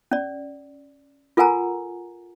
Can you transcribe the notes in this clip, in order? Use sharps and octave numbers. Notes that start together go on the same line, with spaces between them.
C#4 D5
F4 A4 A#4 F#5 G#5 A#5